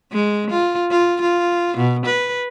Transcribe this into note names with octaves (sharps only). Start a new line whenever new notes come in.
G#3
F4
F4
F4
B2
B4